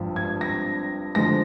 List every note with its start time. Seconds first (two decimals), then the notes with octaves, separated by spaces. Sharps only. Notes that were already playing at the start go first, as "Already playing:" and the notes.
Already playing: G#1 G2 F3
0.16 G#6
0.41 A#6
1.15 D3 F3 G#3 A#6